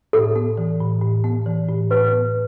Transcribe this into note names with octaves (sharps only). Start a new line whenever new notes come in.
A2 A4
B3
E3
A2
A2
B3
E3
A2
A2 B4
B3